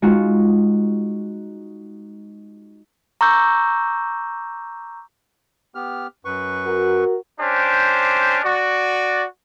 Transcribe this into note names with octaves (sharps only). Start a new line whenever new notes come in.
G#3 D#4 F4 F#4
A#5 C#6 D6 E6 G6
B3 G4 F6
F#2 B4 C#6
F#4 A#4
C#4 D4 G4 C5
F#4 D5